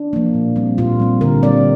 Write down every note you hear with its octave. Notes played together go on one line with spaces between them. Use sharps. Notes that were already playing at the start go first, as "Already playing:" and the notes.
Already playing: D4
F3 A#3
A#2
G3 C4
A#2 F4
G3 C4
D3 A#4
G3 C4 D5